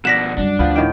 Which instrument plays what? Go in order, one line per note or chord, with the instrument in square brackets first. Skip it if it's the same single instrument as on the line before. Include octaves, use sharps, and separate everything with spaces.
[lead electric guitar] B2 F3 [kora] D5 F#5 [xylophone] A#6 B6 E7
[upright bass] F#2 G3 [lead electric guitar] D4
[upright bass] D2 [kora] F3 B3
[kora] A2 D#3 G5